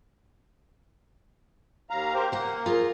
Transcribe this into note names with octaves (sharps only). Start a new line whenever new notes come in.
D#2 F5 A#5
G4 A#4 C5
A#3 C5 F#5
F4 G#4 A#4